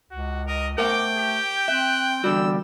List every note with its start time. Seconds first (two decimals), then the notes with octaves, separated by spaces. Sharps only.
0.11 C#2 F#4
0.47 A#4 D#5
0.78 A3 A#4 C5 F#5 G5 D6
1.17 G4
1.68 C4 E5 F#6
2.24 E2 D3 G3 F#4 E6